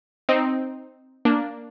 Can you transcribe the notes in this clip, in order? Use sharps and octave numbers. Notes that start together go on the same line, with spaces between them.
C4 D#4
A#3 D4